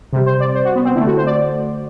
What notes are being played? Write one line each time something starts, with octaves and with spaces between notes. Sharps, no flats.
C3 G3
C5
D5
C5
F#4
B3
C4
D3 A3 E4
F#4
C5
D5